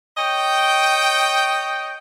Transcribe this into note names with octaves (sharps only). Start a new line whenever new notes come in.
C#5 D#5 G5